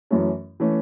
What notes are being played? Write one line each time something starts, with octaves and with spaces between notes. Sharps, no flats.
F#2 E3 A3 C#4
E3 A3 C#4